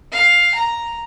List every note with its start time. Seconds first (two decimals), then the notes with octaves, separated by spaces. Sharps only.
0.12 F5
0.54 A#5